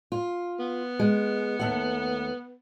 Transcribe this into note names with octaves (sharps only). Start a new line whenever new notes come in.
F4
B3
G#3
D#2 A3 F#5